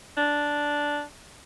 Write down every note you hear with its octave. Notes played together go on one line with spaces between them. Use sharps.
D4